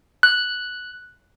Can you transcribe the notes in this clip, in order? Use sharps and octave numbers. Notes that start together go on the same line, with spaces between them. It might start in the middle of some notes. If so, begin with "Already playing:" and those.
F#6